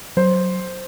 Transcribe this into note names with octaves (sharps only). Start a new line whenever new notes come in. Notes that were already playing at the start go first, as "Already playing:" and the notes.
F#3 C5